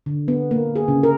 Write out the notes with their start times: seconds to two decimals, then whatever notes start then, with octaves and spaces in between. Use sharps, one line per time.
0.06 D3
0.28 B3
0.51 A#3
0.76 G#4
0.88 C#3
1.03 A#4